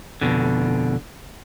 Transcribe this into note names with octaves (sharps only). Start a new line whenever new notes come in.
F2 G#2 B2 D3